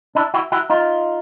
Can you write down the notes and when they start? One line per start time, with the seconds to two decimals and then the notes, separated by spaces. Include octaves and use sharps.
0.15 D4 E4
0.34 E4 F#4
0.52 E4 F#4
0.70 D#4 F4